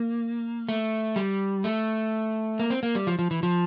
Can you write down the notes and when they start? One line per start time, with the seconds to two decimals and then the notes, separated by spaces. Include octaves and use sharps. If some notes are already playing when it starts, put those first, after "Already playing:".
Already playing: A#3
0.69 A3
1.16 G3
1.64 A3
2.59 A#3
2.70 C4
2.83 A#3
2.95 G3
3.07 F3
3.19 F3
3.31 E3
3.43 F3